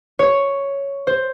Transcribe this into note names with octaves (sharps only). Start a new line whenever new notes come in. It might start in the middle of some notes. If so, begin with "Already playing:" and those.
C#5
C5